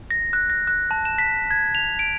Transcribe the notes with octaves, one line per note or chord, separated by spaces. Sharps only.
A#6
F#6
A#6
F#6
A5
E7
B6
G#6
F7
D7